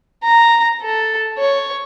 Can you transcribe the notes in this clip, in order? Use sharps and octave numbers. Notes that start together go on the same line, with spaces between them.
A#5
A4
C#5